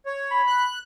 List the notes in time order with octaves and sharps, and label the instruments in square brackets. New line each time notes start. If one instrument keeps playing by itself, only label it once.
[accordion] C#5
[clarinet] B5
[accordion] F#6